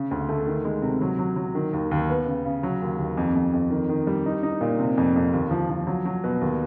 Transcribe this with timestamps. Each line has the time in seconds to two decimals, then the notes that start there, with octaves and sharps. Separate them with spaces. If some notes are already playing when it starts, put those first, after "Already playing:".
Already playing: C#3
0.11 D2
0.29 A3
0.47 D#3
0.65 G#3
0.82 C3
1.01 F#3
1.19 F#3
1.36 F#3
1.55 D#3
1.73 D#2
1.91 D#2
2.09 B3
2.26 C#3
2.45 C#3
2.63 F#3
2.82 D#2
2.99 D#2
3.17 F2
3.35 F2
3.54 F2
3.70 D#3
3.89 D#3
4.07 G3
4.26 D#4
4.43 D#4
4.61 A#2
4.79 C3
4.98 F2
5.16 F2
5.33 D#2
5.51 F3
5.70 F3
5.87 F#3
6.05 F#3
6.24 B2
6.41 D#2